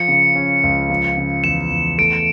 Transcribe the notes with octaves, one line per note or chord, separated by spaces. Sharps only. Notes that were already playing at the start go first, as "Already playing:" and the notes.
Already playing: F3 C#7
C#3
C#4
C#2
F3
C#3
E2 E7
E2
A3 D7